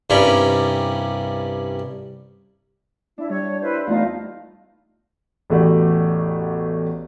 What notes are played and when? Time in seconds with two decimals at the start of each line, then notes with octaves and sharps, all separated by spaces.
0.10 C2 G2 G3 C#4 A#4 B5
3.18 D4 E4
3.29 G3 C#5
3.61 E4 B4 C5
3.87 E2 A3 D#4 F4 F5 A#5
5.50 A1 E2 A3 F#4 G4 D5